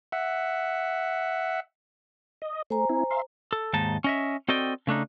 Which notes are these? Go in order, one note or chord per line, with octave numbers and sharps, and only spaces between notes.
E5 F#5
D#5
A3 C5 G#5 A#5
C4 E4
E5 F5 C6
A4
D#2 G#2 D#4 A5
C#4 D#5 E5
C4 F#4 A4 D5 D#5 G5
C#3 A3 D4 D#4